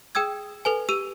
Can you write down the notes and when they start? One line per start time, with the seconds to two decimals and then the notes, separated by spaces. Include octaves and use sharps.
0.15 G#4 G5 D#6 E6 G#6
0.65 A4 B4 G#5
0.89 G4 E6 D#7 F7